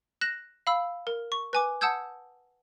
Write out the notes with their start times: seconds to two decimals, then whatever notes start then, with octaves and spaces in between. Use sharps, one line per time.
0.21 F#6 A#6 E7 F#7
0.67 F5 B5 E6
1.07 A#4
1.32 C#6
1.53 B4 G#5 D6
1.81 F#5 A5 D#6 E6 G6 G#6